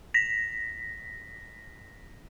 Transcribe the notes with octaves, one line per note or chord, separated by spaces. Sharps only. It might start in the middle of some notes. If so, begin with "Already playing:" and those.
A#6 B6